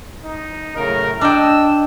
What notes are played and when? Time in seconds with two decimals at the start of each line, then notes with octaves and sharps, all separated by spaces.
0.24 D#4
0.76 F#2 A2 C#3 A#4
1.21 D4 D#5 G5 E6